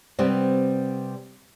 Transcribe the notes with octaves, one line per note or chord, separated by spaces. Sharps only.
C3 G3 B3 C4